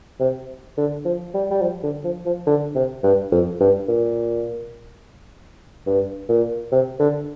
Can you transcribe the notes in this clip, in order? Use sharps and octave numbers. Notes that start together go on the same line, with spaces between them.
C3
D3
F3
G3
G3
F3
D3
F3
F3
D3
C3
G2
F2
G2
A#2
G2
A#2
C3
D3